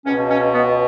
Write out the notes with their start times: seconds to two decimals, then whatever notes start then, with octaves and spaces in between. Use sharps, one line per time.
0.05 C#2 B2 C#4
0.30 C#4
0.54 B3